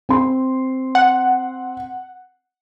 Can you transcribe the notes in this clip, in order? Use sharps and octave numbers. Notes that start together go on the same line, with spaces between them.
C4 C6
F#5